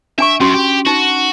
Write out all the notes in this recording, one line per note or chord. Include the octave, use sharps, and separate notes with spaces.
D4 E5 G#5 C#6
F#2 C#4 F#4 C6
G4
D#4 F#4